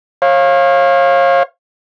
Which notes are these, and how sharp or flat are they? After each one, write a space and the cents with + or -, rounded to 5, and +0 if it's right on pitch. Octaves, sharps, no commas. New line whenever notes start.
C#5 -35 F5 +0